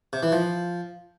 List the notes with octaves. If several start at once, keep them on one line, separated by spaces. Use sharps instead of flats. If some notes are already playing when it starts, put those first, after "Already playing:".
C3
E3
F3